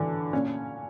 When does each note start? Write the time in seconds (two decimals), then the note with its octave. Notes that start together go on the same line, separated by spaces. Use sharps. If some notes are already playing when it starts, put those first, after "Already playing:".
Already playing: A2 D3 E3
0.33 A#2 C#4